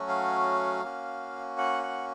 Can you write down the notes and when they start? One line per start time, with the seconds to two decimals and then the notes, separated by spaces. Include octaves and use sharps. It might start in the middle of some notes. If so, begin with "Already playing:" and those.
Already playing: F#3 A3 C#4 F#4
0.09 F5
0.84 A#3 C#4 F#4
1.58 F#5
1.83 F#5